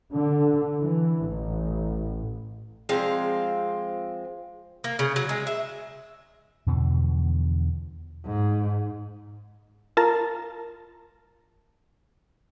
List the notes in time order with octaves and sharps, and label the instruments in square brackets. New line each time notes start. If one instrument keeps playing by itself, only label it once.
[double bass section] D3
E3
A1
[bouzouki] F3 G#3 C4 F5
A#3
C#3
F#3
G#3
E5
[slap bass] E2 B2 D3 F3
[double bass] G#2
[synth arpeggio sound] F4 A#4 A5 A#5